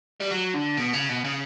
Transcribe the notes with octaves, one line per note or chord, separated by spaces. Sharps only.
G3
F#3
D3
B2
C#3
B2
C#3